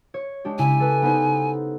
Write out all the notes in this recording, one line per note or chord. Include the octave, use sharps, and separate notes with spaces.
C#5
G#3 D4 G4
C#3 E4 G#5 B6
A4 B4
B3 D#4 C5